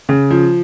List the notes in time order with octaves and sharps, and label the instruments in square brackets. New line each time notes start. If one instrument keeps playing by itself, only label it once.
[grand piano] C#3
F3